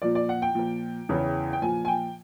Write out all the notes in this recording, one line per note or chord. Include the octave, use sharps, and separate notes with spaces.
A#2 F3 D5
D5
F#5
G5
A#2 F3
E2 C#3 E3
G5
A#2 F3 G#5
G#5
G5